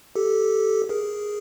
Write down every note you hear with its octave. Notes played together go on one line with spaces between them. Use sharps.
G4 A4
G#4 A#4